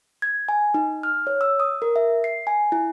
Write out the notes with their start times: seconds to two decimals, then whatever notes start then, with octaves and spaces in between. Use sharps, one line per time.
0.22 G#6
0.49 G#5
0.74 D#4
1.03 F6
1.27 C#5
1.41 E6
1.60 D#6
1.82 A#4
1.96 E5
2.24 C7
2.47 G#5
2.72 E4